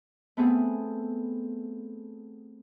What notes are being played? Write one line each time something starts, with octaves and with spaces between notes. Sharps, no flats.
A3 B3 C4 G#4